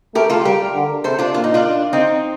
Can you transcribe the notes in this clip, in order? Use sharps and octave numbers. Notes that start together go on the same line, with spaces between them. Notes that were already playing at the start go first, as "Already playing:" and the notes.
A3 G4 A#4
F4 A4
G3 G4 A#4
D3
C3 A4 C5
D4 F4
A#2 F4
D#4
D4 F4
C4 D#4